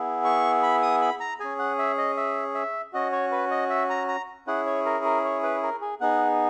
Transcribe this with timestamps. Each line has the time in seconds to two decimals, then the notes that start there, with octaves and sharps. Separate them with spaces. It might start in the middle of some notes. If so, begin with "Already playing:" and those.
Already playing: B3 E4 G#4
0.25 C#6
0.63 B5
0.82 D#6
1.02 B5
1.20 A#5
1.40 C#4 G#4 G#5
1.59 F#5
1.79 E5
1.98 D#5
2.17 E5
2.55 E5
2.93 C#4 F#4 D#5
3.12 C#5
3.32 B4
3.51 D#5
3.70 E5
3.90 A#5
4.08 A#5
4.47 C#4 E4 G#4 F#5
4.66 C#5
4.86 A#4
5.05 A#4
5.25 C#5
5.43 B4
5.63 A#4
5.81 G#4
6.01 B3 D#4 G#4 F#5